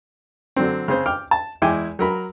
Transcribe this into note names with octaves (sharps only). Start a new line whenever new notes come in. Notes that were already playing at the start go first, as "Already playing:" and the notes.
D3 F#3 C4
C#3 C4 G#4 C5
G5 D6 F6
A5
E2 G#3 E4 G5 G#5 D6
F#3 A#4 B5